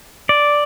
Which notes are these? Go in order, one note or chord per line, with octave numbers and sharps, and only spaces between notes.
D5